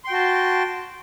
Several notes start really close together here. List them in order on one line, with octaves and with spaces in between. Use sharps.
C6 G5 F#4 A5